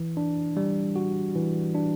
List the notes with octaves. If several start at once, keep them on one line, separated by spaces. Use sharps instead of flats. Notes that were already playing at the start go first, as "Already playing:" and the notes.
Already playing: E3
D4
G3
F#4
E3
D4